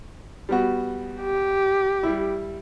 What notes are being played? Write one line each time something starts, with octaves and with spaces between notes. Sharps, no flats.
G3 B3 F#4
G4
G3 E4